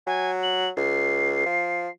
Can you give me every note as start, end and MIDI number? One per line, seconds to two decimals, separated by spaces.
0.07 0.70 54
0.07 0.30 80
0.43 0.69 102
0.77 1.43 37
0.77 1.89 96
1.46 1.88 53